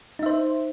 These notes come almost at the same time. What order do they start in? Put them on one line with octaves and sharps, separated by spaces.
D#4 E5 C5